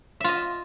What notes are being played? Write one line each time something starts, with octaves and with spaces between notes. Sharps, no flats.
F4 D#5 E5